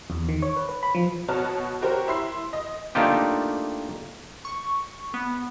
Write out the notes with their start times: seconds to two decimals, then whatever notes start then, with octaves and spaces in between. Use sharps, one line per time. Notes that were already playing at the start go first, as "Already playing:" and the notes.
0.10 E2
0.29 D#3
0.42 C#5
0.56 B4
0.69 B4
0.83 B5
0.95 F3
1.28 B2 F#4 B4 C#5 A5 F6
1.81 F#4 G4 A#4 C5 C#5
2.08 E4 C6 C7
2.53 D#5
2.95 A3 A#3 D4 D#4 F4 G4
4.45 C#6
5.14 B3